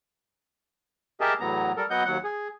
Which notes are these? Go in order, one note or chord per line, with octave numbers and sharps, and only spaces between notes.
G4 G#4 A#4 D#5 E5 A5
E2 A2 F#3 B3 A#5
G3 A4 A#4
F#3 B3 D#5 F#5 G6
D#2 F#3 F#5
G#4